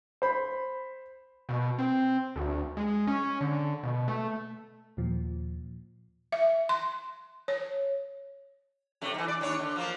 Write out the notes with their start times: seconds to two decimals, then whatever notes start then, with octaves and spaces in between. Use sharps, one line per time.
0.22 C5 B5
1.49 B2
1.79 C4
2.36 D2
2.77 G#3
3.07 C#4
3.41 D3
3.83 B2
4.08 A3
4.97 D#2 A#2 F3
6.32 E5
6.69 C6
7.48 C#5
9.01 F#2 C3 A3
9.14 D#3 E3
9.28 D5
9.41 D#2 D4 C#5
9.59 D3
9.76 F3 A#3